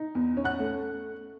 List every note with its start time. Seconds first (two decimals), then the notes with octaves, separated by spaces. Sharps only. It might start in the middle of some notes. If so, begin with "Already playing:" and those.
Already playing: D#4
0.15 E2
0.37 C#4
0.44 F#5 F#6
0.60 A3